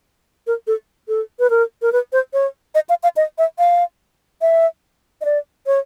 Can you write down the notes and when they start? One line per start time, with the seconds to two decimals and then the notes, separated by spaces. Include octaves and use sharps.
0.47 A#4
0.67 A4
1.08 A4
1.39 B4
1.50 A#4
1.82 A#4
1.93 B4
2.13 C5
2.33 C#5
2.75 D#5
2.89 F5
3.03 F5
3.17 D#5
3.38 E5
3.59 F5
4.41 E5
5.21 D#5
5.25 D5
5.67 C#5